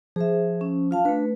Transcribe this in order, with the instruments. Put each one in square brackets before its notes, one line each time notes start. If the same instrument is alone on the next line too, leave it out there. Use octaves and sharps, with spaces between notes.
[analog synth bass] F3 [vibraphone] G#4 C5 E5
[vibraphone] C#4
F4 F5 A5
[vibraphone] A3 B4 [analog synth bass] D4